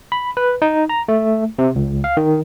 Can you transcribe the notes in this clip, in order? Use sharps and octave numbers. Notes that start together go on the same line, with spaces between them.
B5
B4
D#4
A#5
A3
C3
C#2
F5
D#3